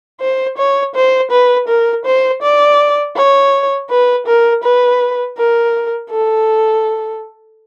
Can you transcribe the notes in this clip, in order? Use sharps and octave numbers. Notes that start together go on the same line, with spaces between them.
C5
C#5
C5
B4
A#4
C5
D5
C#5
B4
A#4
B4
A#4
A4